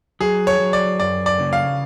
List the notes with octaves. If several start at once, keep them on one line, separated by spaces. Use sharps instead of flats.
F#3 G#4
C#5
F#3
D5
F#2 D5
D5
C#3
F5